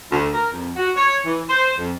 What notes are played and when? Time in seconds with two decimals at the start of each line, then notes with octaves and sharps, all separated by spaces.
0.11 D2
0.34 A#4
0.52 F2
0.76 F#4
0.96 C#5
1.24 E3
1.48 C5
1.78 F2